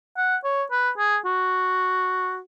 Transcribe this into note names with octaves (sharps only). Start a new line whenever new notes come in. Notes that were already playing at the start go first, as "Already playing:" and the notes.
F#5
C#5
B4
G#4
F#4